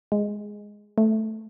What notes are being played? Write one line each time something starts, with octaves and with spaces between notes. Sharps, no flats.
G#3
A3